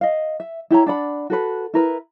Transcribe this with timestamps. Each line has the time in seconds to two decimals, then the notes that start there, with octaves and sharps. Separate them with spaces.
0.01 D#5 F5
0.40 E5
0.71 E4 G4 C#5 A#5
0.86 D4 D5 F#5 B5
1.30 F#4 A4 B4
1.74 E4 A#4 B4